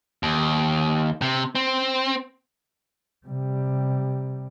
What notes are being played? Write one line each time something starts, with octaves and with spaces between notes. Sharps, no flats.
D#2
C3
C4
C3 G3